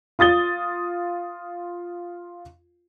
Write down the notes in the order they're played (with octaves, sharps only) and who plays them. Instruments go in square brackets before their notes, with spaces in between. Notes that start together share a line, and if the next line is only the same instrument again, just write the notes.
[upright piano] F4 D#6 A6 G7